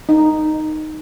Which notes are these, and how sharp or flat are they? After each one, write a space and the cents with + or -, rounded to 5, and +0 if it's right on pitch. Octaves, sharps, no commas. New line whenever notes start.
D#4 -5